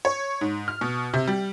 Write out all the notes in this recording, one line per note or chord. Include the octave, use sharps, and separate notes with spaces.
C#5
G#2
F6
B2
C3
G3